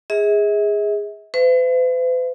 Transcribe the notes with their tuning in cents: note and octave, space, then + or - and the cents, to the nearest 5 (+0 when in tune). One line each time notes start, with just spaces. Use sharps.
G#4 -10 E5 -45
B4 +45 E5 +40